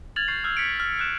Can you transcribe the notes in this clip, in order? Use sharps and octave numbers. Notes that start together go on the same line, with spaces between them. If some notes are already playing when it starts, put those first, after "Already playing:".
F6 G#6 A6 F7 F#7
C#6 F6 G6 C7
E6 F6 G6
B6 C#7 D7
F6
F6 F#6 E7